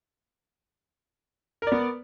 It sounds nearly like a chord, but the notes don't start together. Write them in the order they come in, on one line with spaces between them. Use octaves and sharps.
A#4 D5 B3